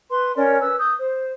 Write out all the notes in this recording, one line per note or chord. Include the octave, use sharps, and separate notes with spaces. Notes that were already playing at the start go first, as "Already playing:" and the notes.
B4 C6
C#4 A#4 C#5 D5
B4 E6
D#6 G6
C5